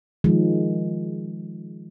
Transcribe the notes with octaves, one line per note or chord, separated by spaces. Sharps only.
D#3 F3 G#3